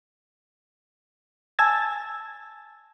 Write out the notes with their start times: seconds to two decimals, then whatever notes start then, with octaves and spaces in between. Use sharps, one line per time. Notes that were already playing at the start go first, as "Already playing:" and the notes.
1.59 G#5 A5 E6 G#6 A6